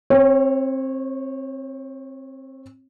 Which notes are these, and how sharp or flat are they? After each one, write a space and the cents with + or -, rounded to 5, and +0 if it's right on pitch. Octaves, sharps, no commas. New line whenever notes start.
C4 +20 C#5 -20